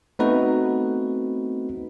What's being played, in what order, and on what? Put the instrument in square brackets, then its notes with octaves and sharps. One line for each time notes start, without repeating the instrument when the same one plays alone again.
[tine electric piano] A3 B3 C4 D#4 F#4 B4